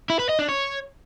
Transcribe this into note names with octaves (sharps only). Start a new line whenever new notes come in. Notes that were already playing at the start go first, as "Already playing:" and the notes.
E4
B4
D#5
D4
C#5